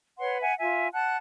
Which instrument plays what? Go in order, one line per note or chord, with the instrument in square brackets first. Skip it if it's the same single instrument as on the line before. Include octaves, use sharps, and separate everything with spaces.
[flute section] B4 C#5 F#5 C6
E5 F#5 G#5
F4 E5 G#5
F#5 A5 F#6